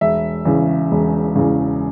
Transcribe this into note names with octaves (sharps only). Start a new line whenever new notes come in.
E1 E5
E2 C#3
E1
E2 C#3